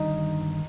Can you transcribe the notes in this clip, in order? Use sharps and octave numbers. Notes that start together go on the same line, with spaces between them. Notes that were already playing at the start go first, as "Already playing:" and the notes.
Already playing: G1 G2 D#3 D#4